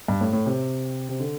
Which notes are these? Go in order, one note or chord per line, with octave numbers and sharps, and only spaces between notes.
G2
A2
A2
C3
C3
D3